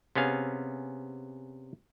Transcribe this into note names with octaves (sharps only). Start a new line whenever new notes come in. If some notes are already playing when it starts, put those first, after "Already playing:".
C3 B3 C#4 G#4 F5